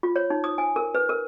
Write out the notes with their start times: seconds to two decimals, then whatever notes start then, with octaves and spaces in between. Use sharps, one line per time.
0.03 F4
0.16 C#5
0.30 D#4
0.44 D#6
0.58 G#5
0.76 A#4
0.95 B4
1.09 A#4